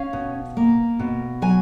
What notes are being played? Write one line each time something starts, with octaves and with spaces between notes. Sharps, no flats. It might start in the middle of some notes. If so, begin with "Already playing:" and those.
Already playing: C#4 F5
B2
A#3
B2
F#3 G#5